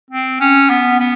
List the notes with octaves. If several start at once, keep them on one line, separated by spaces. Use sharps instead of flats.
C4
C#4
B3
B3